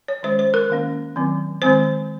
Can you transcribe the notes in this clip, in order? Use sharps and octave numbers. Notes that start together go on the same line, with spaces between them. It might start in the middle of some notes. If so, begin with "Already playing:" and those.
C#5
D#3 G#3 C#4 C5
C5
A#4
D#3 A#3 C#4
D#3 F#3 C4
D#3 G#3 C4 C5